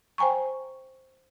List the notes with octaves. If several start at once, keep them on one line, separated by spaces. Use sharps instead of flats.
C5 G5 G#5 A#5 C#6